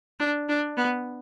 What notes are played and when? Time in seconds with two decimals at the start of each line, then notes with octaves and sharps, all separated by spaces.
0.20 D4
0.49 D4
0.77 B3